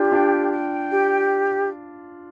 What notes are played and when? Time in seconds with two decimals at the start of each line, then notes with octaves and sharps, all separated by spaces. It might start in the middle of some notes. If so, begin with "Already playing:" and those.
Already playing: D4 F4 G4
0.12 D4 F4 G5
0.51 G5
0.89 G4